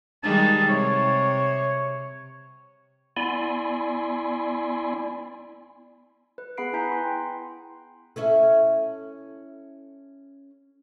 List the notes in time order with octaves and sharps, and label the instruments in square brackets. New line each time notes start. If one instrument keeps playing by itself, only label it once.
[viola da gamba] D#3 G3 G#3 [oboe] A5
[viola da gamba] C3 [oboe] C#5
[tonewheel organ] B3 E4 D5 G#5 B5 C6
[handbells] B4
B3 G#4 F#5 B5 C7 D7
E4 B4 G#5 A#5 G6 B6
G#5 C6
G5
[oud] C#4 E4 A4